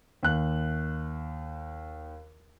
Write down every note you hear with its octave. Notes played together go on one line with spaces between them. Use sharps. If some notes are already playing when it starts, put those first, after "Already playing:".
D#2 F#6